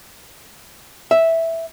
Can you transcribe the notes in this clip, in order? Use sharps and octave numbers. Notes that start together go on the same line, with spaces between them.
E5